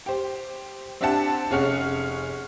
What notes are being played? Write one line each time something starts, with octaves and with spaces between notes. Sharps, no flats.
G4 C5
C4 D4 G4 E5 F#5 A5
F1 C#4 G#4 F#5 F6